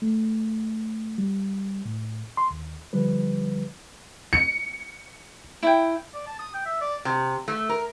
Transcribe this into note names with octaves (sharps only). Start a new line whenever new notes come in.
A3
G3
A2
C6
D#2
D3 F3 G3 B4
C#7
E4 G5
D5
A5
D#6
G5
E5
D5
C3
A3
A#4